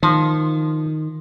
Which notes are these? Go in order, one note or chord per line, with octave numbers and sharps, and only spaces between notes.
D#3 F3